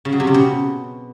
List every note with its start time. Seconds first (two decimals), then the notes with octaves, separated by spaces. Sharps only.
0.05 C#3
0.12 F#3
0.20 C3
0.27 C#3
0.34 B2